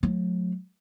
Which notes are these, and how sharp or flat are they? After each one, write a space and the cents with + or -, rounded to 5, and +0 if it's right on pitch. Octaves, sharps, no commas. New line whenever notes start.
F#3 -40 A3 -30